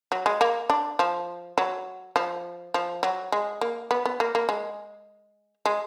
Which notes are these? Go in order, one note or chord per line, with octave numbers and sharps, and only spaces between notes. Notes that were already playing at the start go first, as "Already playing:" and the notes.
F#3
G#3
A#3
D4
F3
F#3
F3
F3
F#3
G#3
A#3
B3
B3
A#3
A#3
G#3
G#3